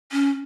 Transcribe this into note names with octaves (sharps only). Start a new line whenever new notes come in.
C#4